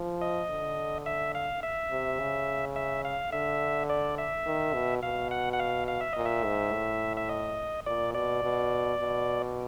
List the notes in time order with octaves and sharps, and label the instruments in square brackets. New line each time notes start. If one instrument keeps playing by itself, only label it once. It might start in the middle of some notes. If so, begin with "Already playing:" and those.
Already playing: [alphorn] F3
[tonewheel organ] D#5
[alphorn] D3
[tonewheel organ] E5
F5
E5
[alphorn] C3
C#3
[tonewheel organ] E5
F5
[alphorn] D3 [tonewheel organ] E5
[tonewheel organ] D5
E5
[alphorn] D#3
B2
[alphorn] B2 [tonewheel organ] F5
[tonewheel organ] F#5
F#5
F5
F5
E5
[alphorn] A#2 [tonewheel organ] D#5
[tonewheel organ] E5
[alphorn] G#2
A2
[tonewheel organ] E5
D#5
[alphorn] A#2 [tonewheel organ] D5
[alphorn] B2 [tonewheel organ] D5
[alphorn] B2
B2